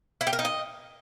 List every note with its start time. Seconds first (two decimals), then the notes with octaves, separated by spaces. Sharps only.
0.21 E4
0.27 G4
0.33 A#4
0.39 D#4
0.45 D#5